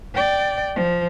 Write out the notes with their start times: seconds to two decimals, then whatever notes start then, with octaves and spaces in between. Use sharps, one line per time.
0.15 D5 G5
0.75 F3